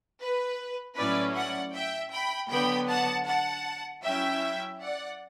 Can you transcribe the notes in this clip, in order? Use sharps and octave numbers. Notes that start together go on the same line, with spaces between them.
B4
A2 F#3 C#4 E4 B4 D5
D5 F#5
E5 G5
G5 B5
D3 F#3 B3 G5 B5
F#5 A5
F#5 A5
F#3 C#4 E4 E5 G5
D5 F#5